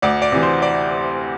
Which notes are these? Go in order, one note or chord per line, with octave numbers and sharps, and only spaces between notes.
D2 D5
D5
C3 E3
C5
D5